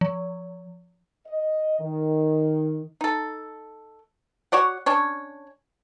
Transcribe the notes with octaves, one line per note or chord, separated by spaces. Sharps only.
F3
D#5
D#3
D#4 A4
F#4 C#5 D5 F#5
C#4 D4 C#5